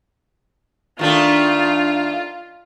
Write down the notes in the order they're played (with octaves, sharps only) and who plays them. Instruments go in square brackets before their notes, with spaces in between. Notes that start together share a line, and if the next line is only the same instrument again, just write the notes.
[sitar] D#3 A3 D4 [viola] F4